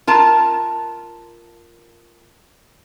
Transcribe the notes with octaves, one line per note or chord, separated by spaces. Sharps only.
F4 A#4 A5